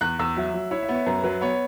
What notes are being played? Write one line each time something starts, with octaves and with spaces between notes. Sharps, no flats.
E2 F#6
E2 E6
F#3 E5
F#3
E4 C#5
E5
B3
C#5
F#2 B4
F#3 B4
B3 C#5